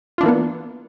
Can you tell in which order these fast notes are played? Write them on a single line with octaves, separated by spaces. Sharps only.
F4 D4 E3 A#3 B3